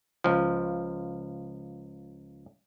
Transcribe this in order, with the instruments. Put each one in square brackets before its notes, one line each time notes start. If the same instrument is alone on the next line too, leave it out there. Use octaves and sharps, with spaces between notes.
[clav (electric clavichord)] C#2 F3